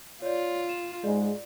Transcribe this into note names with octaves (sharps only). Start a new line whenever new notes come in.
F4 C#5 D5
E7
G#2 G#3 F4 D5